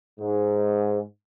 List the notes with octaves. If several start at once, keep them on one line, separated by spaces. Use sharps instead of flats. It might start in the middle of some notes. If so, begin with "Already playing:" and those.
G#2